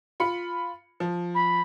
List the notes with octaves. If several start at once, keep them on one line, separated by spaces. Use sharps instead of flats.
F4 B5 C#7
F3
B5